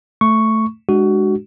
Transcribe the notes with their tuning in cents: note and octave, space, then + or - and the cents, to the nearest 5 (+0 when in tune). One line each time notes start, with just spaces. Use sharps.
A3 +0 C#6 +0
G#3 +0 D4 +30 F#4 +20